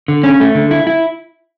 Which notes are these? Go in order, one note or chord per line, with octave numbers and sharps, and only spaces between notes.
D3
C#4
A3
D3
E4
E4